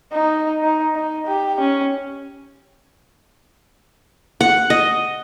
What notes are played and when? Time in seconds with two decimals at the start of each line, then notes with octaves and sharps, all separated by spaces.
0.12 D#4
0.63 D#4
0.95 D#4
1.26 G4
1.60 C#4
4.41 F#5
4.70 D#5